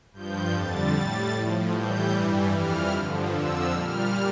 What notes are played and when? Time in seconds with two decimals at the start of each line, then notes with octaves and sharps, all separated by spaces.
0.13 G2 F3 G6
0.52 F2 D3 G3 A6
0.93 A2 G3 A6
1.33 A2 F3
1.72 A2 E3 G3 G6
2.13 G2 E3 G3
2.52 F2 E3 G3 F6
2.92 G2 D3 F3
3.32 F2 D3 F3 E6
3.71 A#2 G3 F6